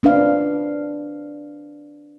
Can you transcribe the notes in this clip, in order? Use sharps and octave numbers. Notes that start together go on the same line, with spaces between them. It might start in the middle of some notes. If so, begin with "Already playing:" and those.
C4 D4 B4 F5